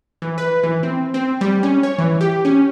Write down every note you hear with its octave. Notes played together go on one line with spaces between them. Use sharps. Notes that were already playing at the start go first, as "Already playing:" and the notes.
E3
B4
E3
C4
C4
G3
C#4
C#5
E3
G4
C#4